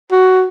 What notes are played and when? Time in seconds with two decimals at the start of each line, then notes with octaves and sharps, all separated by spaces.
0.12 F#4